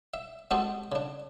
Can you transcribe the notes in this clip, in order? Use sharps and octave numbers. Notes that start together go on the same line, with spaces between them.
E5
G#3 C4 F#4 G4 A4 D#5
C#3 D4